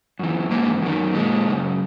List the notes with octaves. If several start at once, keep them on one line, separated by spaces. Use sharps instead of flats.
F#2 E3
G#2 E3 A#3
F#2 D#3
A#2 G#3
F#2 C#3